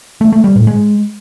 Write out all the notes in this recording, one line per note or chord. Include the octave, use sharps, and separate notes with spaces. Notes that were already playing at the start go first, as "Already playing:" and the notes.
A3
A3
G3
A2
G#3